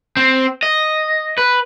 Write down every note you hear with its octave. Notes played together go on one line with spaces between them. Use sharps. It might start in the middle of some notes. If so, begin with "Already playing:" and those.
C4
D#5
B4